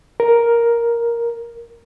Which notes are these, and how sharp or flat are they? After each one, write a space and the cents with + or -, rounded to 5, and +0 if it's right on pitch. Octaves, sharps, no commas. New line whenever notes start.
A#4 +5